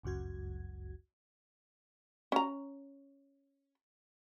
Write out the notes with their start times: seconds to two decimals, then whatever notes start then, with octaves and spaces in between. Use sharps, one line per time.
0.03 G1 C#2 F#2 F#4 G#6
2.32 C#4 A#5